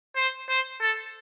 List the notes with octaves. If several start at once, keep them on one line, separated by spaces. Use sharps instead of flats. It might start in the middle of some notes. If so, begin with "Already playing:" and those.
C5
C5
A4